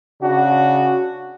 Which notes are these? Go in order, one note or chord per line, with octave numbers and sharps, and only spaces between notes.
C#3 D4 F#4